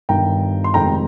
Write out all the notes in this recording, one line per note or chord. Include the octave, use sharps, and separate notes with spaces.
G1 G2 D#3 G5 A#5
C6
F1 F2 D#3 G#3 C4 G5 A#5